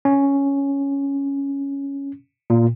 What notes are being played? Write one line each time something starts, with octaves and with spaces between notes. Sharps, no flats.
C#4
A#2